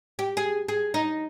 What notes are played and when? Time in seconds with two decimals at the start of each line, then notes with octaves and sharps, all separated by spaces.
0.19 G4
0.37 G#4
0.68 G#4
0.94 D#4